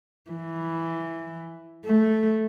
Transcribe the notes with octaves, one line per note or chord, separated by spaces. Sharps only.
E3
A3